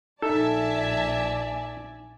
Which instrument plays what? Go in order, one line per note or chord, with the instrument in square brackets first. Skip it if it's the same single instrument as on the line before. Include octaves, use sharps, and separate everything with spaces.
[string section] A#1 E5 A5 [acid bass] D#4 [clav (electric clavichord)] A4 [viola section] D5 G#5